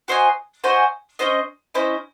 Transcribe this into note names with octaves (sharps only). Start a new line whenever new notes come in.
F#4 C5 D#5 G#5
F#4 C5 D#5 G#5
C#4 E4 C5 D#5
C#4 E4 C5 D#5